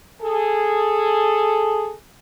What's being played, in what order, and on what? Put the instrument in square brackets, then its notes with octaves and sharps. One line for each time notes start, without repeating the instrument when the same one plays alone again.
[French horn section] G#4 A4